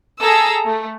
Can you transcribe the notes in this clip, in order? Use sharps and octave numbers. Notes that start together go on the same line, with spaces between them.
G#4 A4 A#5 E6
A3